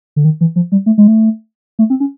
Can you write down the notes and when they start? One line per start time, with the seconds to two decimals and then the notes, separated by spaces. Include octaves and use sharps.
0.16 D3
0.25 D#3
0.41 E3
0.56 F3
0.72 G3
0.86 A3
0.98 G#3
1.08 A3
1.79 A3
1.90 C4
2.00 C#4